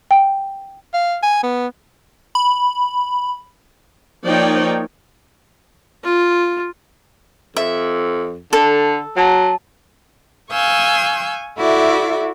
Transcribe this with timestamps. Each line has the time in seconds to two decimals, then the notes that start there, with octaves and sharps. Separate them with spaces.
0.11 G5
0.94 F5
1.23 G#5
1.43 B3
2.35 B5
4.25 F3 A#3 D#4 C#5 D5 G5
6.04 F4
7.57 F2 E5
8.53 D3 A4
9.17 F#3 F#5 A5
10.51 F5 G#5 C#6 E6 G6
11.57 E4 F#4 A4 D5 E5